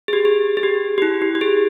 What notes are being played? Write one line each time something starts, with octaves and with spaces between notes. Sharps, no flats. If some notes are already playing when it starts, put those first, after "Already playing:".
G#4
G4
G#4
G#4
G4
G4
E4
G4
G4
G#4